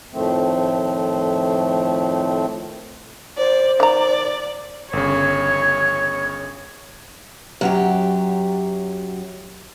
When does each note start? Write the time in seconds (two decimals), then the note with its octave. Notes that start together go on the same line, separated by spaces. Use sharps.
0.12 F2 A2 D#3 F3 A3 C4
3.38 C5 D5
3.80 D#3 D5 A#5
4.93 G1 C#3 C#5
7.61 F#2 F#3 G4